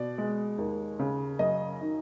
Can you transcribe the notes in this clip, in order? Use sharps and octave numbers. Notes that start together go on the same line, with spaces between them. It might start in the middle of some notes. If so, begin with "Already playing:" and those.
Already playing: B2 D5
G#3
D#2
C#3
F#2 D#5
D#3